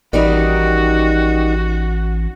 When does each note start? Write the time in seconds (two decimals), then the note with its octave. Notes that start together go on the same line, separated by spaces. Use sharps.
0.13 A1 D#3 G3 D#4 F#4